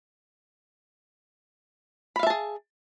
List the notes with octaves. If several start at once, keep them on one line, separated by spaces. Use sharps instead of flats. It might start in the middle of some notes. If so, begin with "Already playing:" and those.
G#4 E5 F5 A5 B5